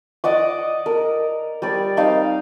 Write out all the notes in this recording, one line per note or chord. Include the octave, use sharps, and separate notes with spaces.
D5 D#5 F#5 D6
A#4
G3 D5
C4 D#4 F5